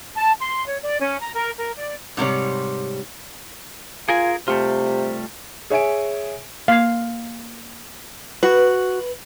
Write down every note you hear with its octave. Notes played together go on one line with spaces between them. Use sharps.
A5
C6
C#5
D5
C#4
A#5
A#4
A#4
D5
G#2 C3 G3 C#5
F4 G#4 A#4 G#5
C3 G3 A3 F4
G#4 C#5 E5 G#5 D7
A#3 F5 G#6
F#4 B4 F#6